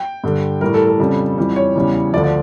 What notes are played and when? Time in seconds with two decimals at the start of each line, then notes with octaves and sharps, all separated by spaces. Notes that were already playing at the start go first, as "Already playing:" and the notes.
Already playing: G5
0.24 G2 D3 G3
0.61 A2 E3 G3 A#4
0.74 A4
0.87 A4
0.99 F2 C#3 G3
1.38 F2 E3 G3
1.56 C#5
1.76 E2 C#3 E3 G3
2.13 D2 D3 F3 D5
2.24 D5